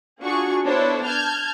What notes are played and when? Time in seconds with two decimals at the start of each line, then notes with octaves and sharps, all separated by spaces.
0.21 D4 F4 F#4 G#4 C#6
0.65 B3 D4 E4 A4 C5 C#5
1.04 A5 F6 G6 G#6